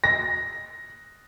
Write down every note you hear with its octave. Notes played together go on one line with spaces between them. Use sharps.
A#6